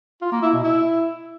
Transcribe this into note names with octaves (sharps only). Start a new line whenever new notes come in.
F4
A#3
E4
B2
E4